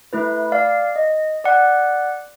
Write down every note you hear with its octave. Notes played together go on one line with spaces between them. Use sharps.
A3 E4 B4
D5 F5
D#5
D5 F#5